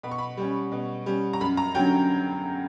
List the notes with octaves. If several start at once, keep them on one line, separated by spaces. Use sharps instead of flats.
B2 B5
C#6
B5
G3 C#4
B2
G3 C#4
A#5
F#2 B5
A#5
D3 F#3 C#4 G5